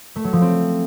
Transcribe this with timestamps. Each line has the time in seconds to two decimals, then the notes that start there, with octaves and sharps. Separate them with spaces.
0.16 A3
0.24 F#3
0.33 F3
0.42 C4